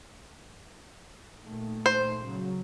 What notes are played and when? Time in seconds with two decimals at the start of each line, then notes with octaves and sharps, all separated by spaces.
1.42 A#2 D#3 A3
1.86 C5
2.23 C#3 F#3